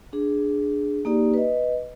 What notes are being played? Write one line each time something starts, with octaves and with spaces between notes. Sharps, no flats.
D4 G#4
A#3 D#4 G4 D5
B4 D#5